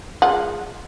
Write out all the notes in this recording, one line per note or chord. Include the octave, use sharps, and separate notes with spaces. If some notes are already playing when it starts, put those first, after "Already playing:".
G#3 F4 F#5